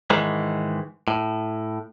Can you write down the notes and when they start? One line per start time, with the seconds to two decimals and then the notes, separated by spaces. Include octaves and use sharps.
0.10 G#2 D#3 E3 G#3
1.08 A2